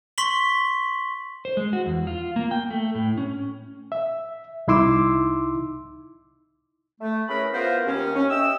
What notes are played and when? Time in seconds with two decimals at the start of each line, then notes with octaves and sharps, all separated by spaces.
0.18 C6 C#6 B6 F#7 G7
1.45 C5
1.57 G#3
1.73 F#4
1.86 E2
2.07 F4
2.36 A#3
2.51 G5
2.71 A3
2.95 A2
3.18 C#4
3.92 E5
4.67 C2 D#4 E4 C6 D6 E6
7.01 A3
7.28 C#4 E4 G#4 A#4 B4 B5
7.53 B3 E4 F4 A#4 C5
7.86 D#2 C#4
8.15 C#4
8.30 D#5 E5 G5 E6